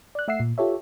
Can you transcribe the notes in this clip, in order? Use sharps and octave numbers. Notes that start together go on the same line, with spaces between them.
D5 F#6
A3 E5 F#5 E6 C7
A#2
F4 G4 A4 C#5 E5